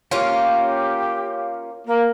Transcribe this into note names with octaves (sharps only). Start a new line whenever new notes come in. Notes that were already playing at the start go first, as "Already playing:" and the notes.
A#3 C#4 F4 G4 F5
A#3 A#4